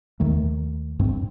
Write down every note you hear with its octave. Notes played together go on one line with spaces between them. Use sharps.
D#2 D#3 A3
G2 C4